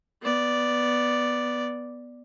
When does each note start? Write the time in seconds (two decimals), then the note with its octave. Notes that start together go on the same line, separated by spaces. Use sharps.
0.23 B3 D5